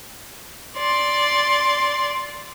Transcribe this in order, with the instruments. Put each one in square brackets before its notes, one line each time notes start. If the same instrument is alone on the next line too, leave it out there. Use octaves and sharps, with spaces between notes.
[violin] D5 C6